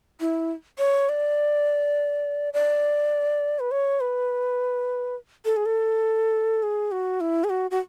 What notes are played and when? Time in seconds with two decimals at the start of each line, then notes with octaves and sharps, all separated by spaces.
0.20 E4
0.79 C#5
1.09 D5
2.54 D5
3.60 B4
3.71 C#5
4.00 B4
5.45 A4
5.57 G#4
5.66 A4
6.63 G#4
6.92 F#4
7.21 E4
7.44 G#4
7.50 F#4
7.71 F#4